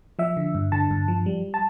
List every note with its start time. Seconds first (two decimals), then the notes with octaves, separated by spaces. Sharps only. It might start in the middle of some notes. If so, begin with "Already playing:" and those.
0.19 F3 E5
0.37 D3
0.55 G2
0.72 D3 A5
0.91 G2
1.08 F3
1.26 G3
1.54 A5